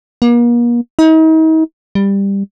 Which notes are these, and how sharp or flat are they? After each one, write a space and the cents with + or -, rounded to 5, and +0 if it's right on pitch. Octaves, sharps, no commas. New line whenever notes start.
A#3 +40
D#4 +40
G3 +15